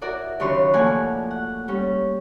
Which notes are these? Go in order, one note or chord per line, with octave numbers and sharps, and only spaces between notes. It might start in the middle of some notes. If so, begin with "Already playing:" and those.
E4 F#4 A#4 D5
D#2 C#3 F#3 D4 C#5 C6
A#2 F3 A3 D4 F#5 G#5
F#5
G3 C#4